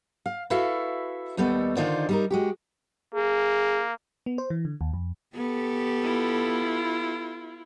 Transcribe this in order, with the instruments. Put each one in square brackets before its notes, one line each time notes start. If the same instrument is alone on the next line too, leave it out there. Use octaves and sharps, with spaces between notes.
[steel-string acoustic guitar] F5
E4 F#4 A4 B4 E5 F5
D#2 G3 A3 B3 A4 D#5
D3 D#3 D#4 F4 C5 D5
G3 D#4 A#4
G#3 F#4 G4
[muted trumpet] A#3 [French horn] G#4
[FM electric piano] B3
C5
E3
D3
D#2
F2
[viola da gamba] B3 G4 A4
[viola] E4 F4